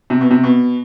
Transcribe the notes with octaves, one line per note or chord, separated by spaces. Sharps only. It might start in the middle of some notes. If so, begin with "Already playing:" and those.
C3
B2
C3
B2